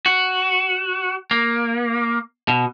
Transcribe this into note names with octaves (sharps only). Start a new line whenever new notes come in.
F#4
A#3
B2